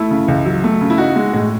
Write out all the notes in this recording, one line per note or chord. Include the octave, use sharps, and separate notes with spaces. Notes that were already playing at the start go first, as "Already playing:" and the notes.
Already playing: A3 E4
C#3
C#2
F#3
A3
C#3
E4
D#4 F#4
G#3
A2